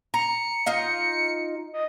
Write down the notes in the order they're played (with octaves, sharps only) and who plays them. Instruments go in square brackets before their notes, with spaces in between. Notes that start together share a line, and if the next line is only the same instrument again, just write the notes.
[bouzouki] A#5 [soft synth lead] C#7
[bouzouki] D#4 F4 D#5
[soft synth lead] D#5